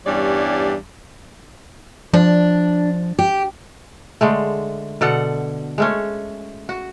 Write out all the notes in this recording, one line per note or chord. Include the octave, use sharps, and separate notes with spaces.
E2 G2 G3 C#4 C#5 D5
F3 D4
G4
D3 G#3 A3
B2 D3 A4 F#5
G#3 A3 C#4
F#4